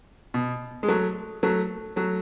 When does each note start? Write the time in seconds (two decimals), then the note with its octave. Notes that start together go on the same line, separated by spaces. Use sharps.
0.34 B2
0.83 G#3
0.88 F#3 A3
1.43 F#3 A3
1.96 F#3 A3